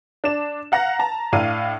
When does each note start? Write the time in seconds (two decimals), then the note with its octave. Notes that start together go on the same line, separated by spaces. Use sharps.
0.24 D4 D5 E7
0.72 F5 F#5 A#5 A#6
0.99 A5 A#5
1.32 A2 D4 F5 D#7